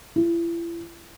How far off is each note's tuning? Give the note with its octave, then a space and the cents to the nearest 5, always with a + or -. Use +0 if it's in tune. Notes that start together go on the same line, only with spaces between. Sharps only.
E4 +40